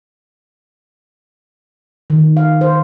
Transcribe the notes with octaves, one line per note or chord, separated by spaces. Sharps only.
D#3
F5
C5